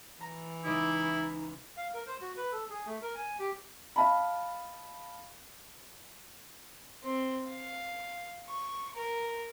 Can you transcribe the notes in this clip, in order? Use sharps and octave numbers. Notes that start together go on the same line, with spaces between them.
E3 A#5
C#2 D#4 E4 D#5 D6
F5
A#4
C5
F#4
B4
A4
G#4
A3
A#4
G#5
G4
D#5 F5 A5 B5
C4
F5
C#6
A#4